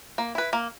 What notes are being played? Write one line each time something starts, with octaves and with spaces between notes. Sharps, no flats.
A#3
E4 B4
A#3